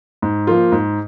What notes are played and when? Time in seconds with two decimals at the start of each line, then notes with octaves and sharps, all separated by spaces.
0.22 G#2
0.47 F3 A#3 F4
0.72 G#2